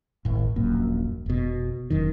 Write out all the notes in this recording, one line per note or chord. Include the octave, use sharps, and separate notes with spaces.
D#1 G#1 A2
D#1 A#1 F#2 A#3
F1 B2
F1 F#2 D#3